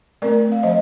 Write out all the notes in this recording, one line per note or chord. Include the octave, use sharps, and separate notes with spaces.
A3 C4 A#4 D5
F5
F3 C5 D#5